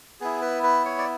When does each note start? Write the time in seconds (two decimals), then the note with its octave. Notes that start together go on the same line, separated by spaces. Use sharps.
0.20 B3 E4 G#4
0.42 B4
0.63 B4
0.85 C#5
0.98 D5